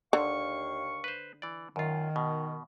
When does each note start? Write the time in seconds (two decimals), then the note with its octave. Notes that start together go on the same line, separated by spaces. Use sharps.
0.13 D#2 D3 F5 C#6
1.04 B4 C5
1.42 E3 D5
1.76 F#2 D#3 F4
2.16 B2